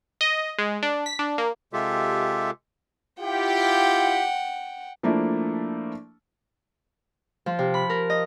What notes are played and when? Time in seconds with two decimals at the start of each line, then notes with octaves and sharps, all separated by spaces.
0.21 D#5
0.58 G#3
0.83 D4
1.06 B6
1.19 D4
1.38 A#3
1.73 C3 G#3 F4 G4 A4 E5
3.20 E4 F4 G4 F#5 G5
5.03 F3 A3 A#3 D4 E4
7.46 F3
7.59 C3
7.74 B5
7.90 A#4
8.10 D#5